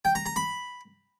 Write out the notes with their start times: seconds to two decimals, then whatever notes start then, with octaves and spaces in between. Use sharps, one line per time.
0.05 G5
0.15 A#5
0.26 A#5
0.36 B5